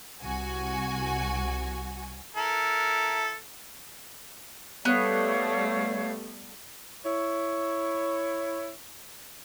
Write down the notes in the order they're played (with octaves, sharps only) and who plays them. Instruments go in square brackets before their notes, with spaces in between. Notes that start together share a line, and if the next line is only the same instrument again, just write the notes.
[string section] C2 F#4 G#5
[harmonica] E4 A4 A#4
[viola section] G3 A3 [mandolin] B3 F#6 [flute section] C#5 F5
[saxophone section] E4 C#5